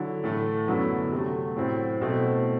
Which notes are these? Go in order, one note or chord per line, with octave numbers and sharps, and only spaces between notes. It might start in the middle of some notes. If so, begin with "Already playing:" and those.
Already playing: D3 F#3 E4
A2 E3 A3
F#2 D3 F#3 B3 E4
C3 F#3 A3
A2 F#3 C4 E4
B2 A3 C4 E4